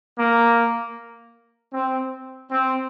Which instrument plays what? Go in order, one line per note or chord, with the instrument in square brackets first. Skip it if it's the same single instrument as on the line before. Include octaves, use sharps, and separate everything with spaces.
[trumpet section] A#3
C4
C4